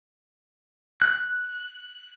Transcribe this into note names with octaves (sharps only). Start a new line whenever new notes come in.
F#6